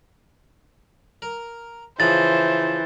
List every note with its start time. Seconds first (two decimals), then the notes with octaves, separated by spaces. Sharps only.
1.22 A#4
2.00 C#3 E3 F3 C5 D#5 A6